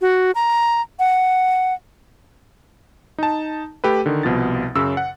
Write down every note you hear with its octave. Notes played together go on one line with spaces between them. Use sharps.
F#4
A#5
F#5
D#4 A5
A3 G4 A4 B4
D3 D#3
C2 B2 F3 A6
F#2 C#3 E6
F#5